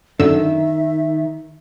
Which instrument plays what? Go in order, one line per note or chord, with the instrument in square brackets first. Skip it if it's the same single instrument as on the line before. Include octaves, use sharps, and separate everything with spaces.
[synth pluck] F#2 D3 E6 [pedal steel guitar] D#3 [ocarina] E5